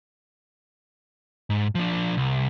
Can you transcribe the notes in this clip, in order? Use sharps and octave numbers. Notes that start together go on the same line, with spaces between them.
G#2
F3 D4
C2